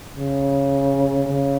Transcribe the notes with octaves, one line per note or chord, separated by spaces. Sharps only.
C#3
C#3